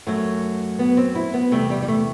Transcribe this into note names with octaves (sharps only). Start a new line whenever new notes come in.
F#2 F#3 A3
B3
C4
E4
B3
E2 C3 G3 A3
G3
G3
A3